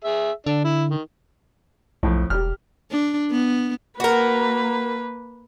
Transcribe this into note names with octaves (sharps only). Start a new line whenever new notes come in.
G#4 E5
D3 D4
E4
D#3
B1 F2 A2
E1 G4 F6
D4
B3
A#3 F#4 A#4 B4